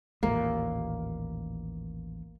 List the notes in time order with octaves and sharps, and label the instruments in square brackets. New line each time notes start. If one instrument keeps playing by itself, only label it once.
[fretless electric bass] A1 D#2 A#2 [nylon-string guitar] A#3